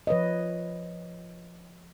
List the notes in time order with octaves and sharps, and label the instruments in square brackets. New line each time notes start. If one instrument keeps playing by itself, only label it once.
[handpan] F3 B4 C#5 D#5